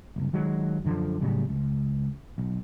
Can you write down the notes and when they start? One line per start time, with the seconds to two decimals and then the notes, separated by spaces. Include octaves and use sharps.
0.16 F#1 C2
0.33 D#3 F#3 G#3
0.85 F#2 D3 D#3 F3
1.21 A2 C#3 F#3 G3
1.49 C#2
2.38 B1